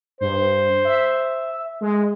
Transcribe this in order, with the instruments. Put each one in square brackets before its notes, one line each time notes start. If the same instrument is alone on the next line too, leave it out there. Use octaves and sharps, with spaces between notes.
[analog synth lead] G2 [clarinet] C5
[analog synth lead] E5
G#3